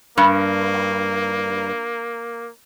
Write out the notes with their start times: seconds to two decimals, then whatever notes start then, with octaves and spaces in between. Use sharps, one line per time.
0.18 G2 A#3